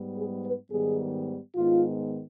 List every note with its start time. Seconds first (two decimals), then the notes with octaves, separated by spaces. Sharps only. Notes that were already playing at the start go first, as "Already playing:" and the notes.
Already playing: G#2 G3 B3
0.13 G#4
0.43 B4
0.70 G#2 D#3 G3 B3 G#4
1.54 G#2 D#3 G#3 B3 F4